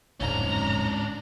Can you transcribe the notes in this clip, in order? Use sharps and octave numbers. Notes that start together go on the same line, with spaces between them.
D1 F2 G#2 C#4 D4 A#5